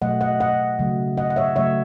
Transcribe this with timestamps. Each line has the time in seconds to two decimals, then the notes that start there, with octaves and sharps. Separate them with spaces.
0.02 B2 F#3 A3 D#5 F#5
0.21 D#5 F#5
0.40 D#5 F#5
0.79 C#3 F#3 A3
1.17 D#5 F#5
1.30 F#5
1.36 C#5 E5
1.56 C#3 F#3 A3 C#5 E5